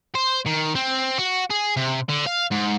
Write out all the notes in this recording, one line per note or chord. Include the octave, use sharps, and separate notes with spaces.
C5
D#3
C4
F#4
G#4
C3
D3
F5
G#2